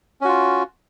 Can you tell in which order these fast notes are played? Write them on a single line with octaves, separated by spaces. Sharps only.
C#4 F#4 F4